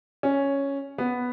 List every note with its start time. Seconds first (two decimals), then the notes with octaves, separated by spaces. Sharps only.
0.23 C#4
0.98 B3